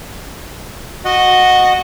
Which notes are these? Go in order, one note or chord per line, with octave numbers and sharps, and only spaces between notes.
F#4 D#5 F#5